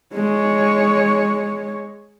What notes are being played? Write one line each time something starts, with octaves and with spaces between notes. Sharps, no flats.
G#3 C#5